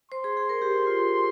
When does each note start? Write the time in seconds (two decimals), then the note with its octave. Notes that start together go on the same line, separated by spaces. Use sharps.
0.12 C5 C6
0.24 G#4
0.37 G#4
0.49 A#4
0.62 G4
0.87 F4